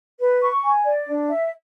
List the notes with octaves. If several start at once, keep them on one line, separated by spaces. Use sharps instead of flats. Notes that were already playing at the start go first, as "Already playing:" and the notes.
B4
C#6
G#5
D5
D4
E5